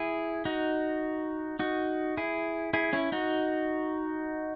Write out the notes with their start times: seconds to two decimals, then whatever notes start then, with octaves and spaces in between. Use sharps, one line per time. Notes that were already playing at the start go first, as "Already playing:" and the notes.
Already playing: E4 G#4
0.45 D#4 F#4
1.59 D#4 F#4
2.17 E4 G#4
2.73 E4 G#4
2.93 C#4 E4
3.12 D#4 F#4